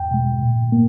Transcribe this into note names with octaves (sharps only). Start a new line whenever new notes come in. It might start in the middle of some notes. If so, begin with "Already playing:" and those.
Already playing: E2 G5
B2 G#3
A#2
A#3